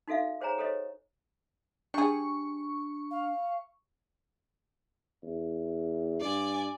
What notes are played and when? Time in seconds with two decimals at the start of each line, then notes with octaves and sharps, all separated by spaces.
0.08 D#4 F#4 A4 E5 F5
0.41 G#4 C5 C#5 G#5 A#5
0.58 G4 A4 C5 C#5 D#5
1.94 G3 D4 G#4 C#6
3.11 F5
5.23 E2
6.21 G2 D5 G#5